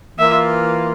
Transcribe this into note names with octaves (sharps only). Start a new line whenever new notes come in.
E3 A#3 F4 E5